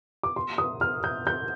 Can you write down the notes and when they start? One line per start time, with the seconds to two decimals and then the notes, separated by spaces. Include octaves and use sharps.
0.23 D6
0.36 C6
0.58 D#6
0.81 F6
1.04 G6
1.27 G6